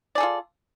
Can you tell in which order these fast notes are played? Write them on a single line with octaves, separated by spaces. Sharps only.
D5 G#4 A4 F4